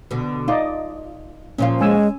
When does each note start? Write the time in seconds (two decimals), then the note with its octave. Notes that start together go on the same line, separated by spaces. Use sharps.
0.11 B2 D3
0.48 D#4 F4 D5 D#5
1.58 A#2 F3 C#4 F4
1.80 G#3 C#4 G#5 E6